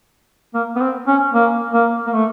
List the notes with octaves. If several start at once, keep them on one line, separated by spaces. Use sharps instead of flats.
A#3
B3
C4
C#4
A#3
A#3
A#3
A3